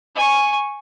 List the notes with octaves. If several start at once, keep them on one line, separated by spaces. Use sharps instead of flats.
G#5 C#6